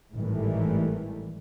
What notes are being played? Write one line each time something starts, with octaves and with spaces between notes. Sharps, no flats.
G#1 A2 D#3 E3 G3 A3